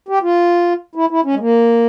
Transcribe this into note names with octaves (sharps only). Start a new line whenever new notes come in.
G4
F4
E4
E4
C#4
G#3
A#3